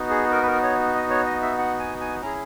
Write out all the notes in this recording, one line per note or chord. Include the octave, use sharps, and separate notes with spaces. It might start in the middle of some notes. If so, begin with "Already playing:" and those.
Already playing: B3 D#4 F#4
G#4
A#4
B4
A#4
C#5
D#5
C#5
D#5
E5
F#5
G#5
G#5
C#4 E4 G#4 A#5